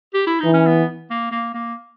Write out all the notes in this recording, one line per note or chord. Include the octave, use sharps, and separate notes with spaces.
G4
E4
E3 D#4
C#4
B3
A#3
A#3
A#3